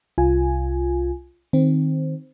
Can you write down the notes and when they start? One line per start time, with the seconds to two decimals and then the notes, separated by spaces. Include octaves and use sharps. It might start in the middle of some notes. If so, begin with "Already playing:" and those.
0.18 C2 F4 G#5
1.53 D#3 C4